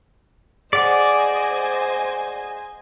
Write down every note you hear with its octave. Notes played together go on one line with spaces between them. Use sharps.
G#4 C5 D5 D#5 F#5 G#5